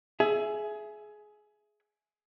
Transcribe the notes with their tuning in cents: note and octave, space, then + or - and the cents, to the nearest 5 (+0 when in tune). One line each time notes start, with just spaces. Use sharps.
G#4 +20 E5 +10